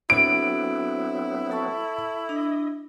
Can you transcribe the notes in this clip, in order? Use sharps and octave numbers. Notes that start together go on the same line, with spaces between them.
F#3 B3 C4 D4 E4 F#4 A4 D7
A4 A5 C#6
D4 D#5